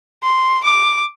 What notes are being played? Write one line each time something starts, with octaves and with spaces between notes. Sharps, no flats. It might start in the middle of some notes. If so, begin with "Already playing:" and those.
C6
D6